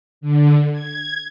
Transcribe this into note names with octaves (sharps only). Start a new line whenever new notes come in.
D3
G#6